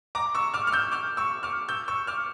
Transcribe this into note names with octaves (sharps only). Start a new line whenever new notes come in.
A#5 D6
C#6 E6
D6 F6
F6
E6 G6
D6 F6
C#6 E6
D6 F6
E6 G6
C#6 E6
D6 F6